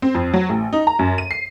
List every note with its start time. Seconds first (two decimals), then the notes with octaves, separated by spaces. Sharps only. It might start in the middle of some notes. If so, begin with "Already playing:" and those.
0.02 C4
0.15 F2
0.34 F#3
0.49 A1
0.73 D#4
0.87 A#5
0.99 F#2
1.18 D#7
1.31 C7